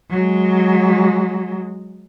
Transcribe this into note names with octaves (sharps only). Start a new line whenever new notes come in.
F#3 G#3